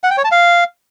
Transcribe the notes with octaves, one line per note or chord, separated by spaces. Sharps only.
F#5
G5
C#5
A5
F5